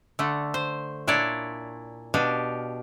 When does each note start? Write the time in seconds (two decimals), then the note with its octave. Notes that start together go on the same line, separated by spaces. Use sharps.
0.19 D3 A3
0.54 C5
1.07 A#2 D4 E4 C#5 D5
2.14 B2 D4 G4 F5